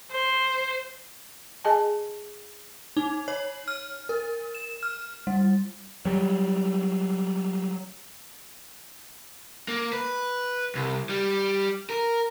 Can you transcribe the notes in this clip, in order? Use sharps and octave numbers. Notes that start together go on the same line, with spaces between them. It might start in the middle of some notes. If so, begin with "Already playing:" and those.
C5
G#4 D#5 G#5 A5
D#4
C#5
F6
A#4
E7
F6
G3
F#3 G3
A#3
B4
C2
G3
A#4